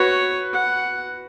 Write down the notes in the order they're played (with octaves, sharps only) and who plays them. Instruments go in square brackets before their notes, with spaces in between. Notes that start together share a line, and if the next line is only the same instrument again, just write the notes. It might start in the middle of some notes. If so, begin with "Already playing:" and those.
Already playing: [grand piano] F#4 B4 [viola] C#5
[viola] F#5